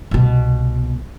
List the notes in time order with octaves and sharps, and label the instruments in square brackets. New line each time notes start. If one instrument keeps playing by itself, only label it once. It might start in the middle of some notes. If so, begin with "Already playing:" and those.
[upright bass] C2 B2